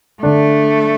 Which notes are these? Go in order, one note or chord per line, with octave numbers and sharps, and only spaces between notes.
D3 A3 D4